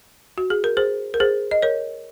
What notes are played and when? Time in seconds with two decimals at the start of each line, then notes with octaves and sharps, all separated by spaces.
0.38 F#4
0.50 G#4
0.64 A#4
0.77 G#4 C5
1.14 A#4
1.20 G#4 C5
1.51 D#5
1.62 A#4 C#5